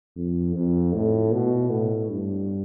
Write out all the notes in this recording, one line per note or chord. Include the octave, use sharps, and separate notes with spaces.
F2
F2
A2
B2
A2
G2